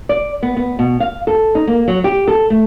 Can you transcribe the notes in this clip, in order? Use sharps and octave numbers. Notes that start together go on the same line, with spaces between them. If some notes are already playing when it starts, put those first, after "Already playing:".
D5
B3
B3
B2
F5
A4
D#4
A#3
F#3
G4
A4
A3